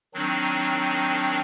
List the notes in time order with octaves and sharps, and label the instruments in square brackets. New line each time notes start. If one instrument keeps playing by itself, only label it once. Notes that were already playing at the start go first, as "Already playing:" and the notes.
[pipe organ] D#3 F#3 C4 D4 D#4